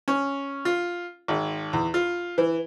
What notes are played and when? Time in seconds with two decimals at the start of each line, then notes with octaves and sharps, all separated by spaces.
0.08 C#4
0.65 F4
1.28 G#1
1.73 E2
1.94 F4
2.38 E3